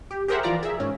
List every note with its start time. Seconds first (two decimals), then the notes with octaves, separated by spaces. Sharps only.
0.11 G4
0.28 G4 G#4 A#4 C5 E5 F#5
0.43 E3 F3 F4 D5 A#5
0.63 G#4 E5
0.80 G#2 C#4